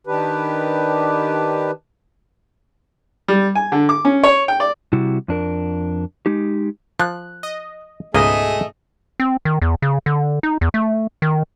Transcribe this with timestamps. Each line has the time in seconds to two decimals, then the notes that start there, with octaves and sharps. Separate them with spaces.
0.07 D#3 D4 G4 B4
3.28 G3
3.55 G#5
3.72 D3
3.89 D6
4.05 C#4
4.24 C#5
4.48 G5
4.60 D5
4.93 C3 G3 E4 F#4
5.28 F2 D4 A#4
6.26 G#3 D#4 G4
7.00 F3 F#6
7.43 D#5
8.14 C#2 G#2 B2 A3 A#3 G#4 D#5
9.20 C4
9.45 D#3
9.62 E2
9.82 C#3
10.06 D3
10.43 D#4
10.61 E2
10.74 A3
11.22 D#3